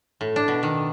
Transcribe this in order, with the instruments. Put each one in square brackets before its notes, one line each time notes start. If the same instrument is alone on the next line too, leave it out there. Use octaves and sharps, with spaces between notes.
[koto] A2
D4
B2
D#3